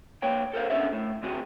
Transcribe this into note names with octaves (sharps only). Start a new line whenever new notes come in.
A#3 B4 C#5 G5
A4 A#4 C5 F5
B3 C#4 D4 A4 D5 E5
A2
D3 C4 F#4 G#4